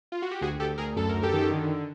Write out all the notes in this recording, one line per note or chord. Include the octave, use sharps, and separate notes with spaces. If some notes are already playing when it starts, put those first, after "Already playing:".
F4
F#4
G4
D2 F#4 G#4
D2 G4 A4
D2 G#4 A#4
F#2 A4
F#2 A#4
G4 A4
D#3
D3